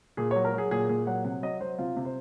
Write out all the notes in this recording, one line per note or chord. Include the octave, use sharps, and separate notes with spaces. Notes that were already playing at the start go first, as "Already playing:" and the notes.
A#2 G#4
C#5
F#3
A#4
F#3 G#4
A#2 G#4
A#2 G#4
F#3 F#5
C3 F#5
F#3 D#5
F#3 C5
C3 F4
C3
C5